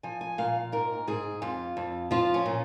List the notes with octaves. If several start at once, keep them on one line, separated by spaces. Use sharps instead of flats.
F3 G#5
G#5
A#2 F5
G#2 A#4
G#2 G#4
F2 F4
F2
F3 F4
C#4
A#2